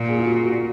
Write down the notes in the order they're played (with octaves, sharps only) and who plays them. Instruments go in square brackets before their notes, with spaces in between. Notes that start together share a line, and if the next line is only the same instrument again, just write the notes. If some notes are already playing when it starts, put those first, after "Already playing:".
Already playing: [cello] A#2
[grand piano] G#4
F4
F#4
F#4